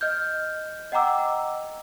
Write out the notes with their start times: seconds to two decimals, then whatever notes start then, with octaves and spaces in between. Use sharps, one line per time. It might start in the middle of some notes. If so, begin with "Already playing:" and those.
0.01 D#5 F6 G6
0.92 D#5 F#5 G5 A#5 D6 E6